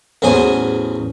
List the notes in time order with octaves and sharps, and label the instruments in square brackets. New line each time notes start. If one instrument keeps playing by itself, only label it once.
[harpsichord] A1 E2 F#3 G#4 C5 G#5